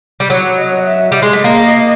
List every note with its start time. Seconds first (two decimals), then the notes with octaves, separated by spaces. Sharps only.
0.20 G3
0.30 F#3 C#5
0.59 D#5
0.86 E5
1.12 G3 D#5
1.22 G#3
1.33 A3
1.44 A#3